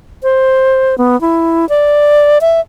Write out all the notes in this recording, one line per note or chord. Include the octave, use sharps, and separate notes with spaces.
C5
B3
E4
D5
E5